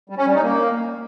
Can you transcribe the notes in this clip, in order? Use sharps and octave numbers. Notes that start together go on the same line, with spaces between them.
G3
C#4
G3
D#4
A#3